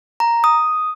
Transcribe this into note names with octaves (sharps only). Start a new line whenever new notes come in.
A#5
D#6